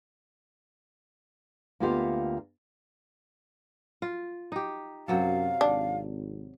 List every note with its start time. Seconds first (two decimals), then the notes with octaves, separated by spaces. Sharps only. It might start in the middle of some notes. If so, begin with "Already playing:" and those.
1.80 D2 A#3 B3 F4 G4 F5
4.02 F4
4.52 D#4 G4
5.08 F#2 C3 F#3 A4 F5
5.61 G#1 D4